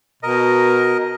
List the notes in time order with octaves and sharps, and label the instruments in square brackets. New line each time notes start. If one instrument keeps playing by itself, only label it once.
[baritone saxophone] B2 [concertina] A#4 D#5